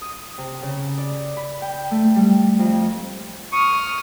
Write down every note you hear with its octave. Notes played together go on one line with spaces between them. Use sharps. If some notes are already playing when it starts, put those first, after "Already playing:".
D#6
C3
C#3
D5
B5
G5
A3
G3
F2
C#6 D#6 F6